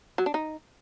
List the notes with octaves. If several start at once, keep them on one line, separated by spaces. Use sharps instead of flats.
F#3
D4
D#4